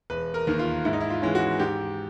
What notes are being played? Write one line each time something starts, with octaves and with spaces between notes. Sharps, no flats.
E1 B4
A#4
D#2 D#3
F4
G#2 E4
D#4
E4
F4
E3 G#3 C#4
F#4
G#2 G4